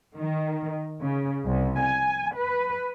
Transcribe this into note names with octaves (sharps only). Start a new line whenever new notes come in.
D#3
C#3
C2
G#5
B4